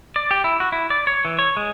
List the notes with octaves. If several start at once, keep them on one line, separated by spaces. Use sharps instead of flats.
D5
G4
E4
F#4
E4
D5
C#5
E3
C#5
G#3